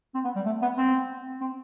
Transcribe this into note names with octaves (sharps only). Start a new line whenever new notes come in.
C4
B3
G3
A3
B3
C4
C4